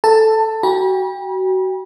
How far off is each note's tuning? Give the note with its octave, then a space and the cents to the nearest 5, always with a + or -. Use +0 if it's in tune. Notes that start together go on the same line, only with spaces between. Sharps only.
A4 +0 A5 +15
F#4 +25 G5 +35 B5 -40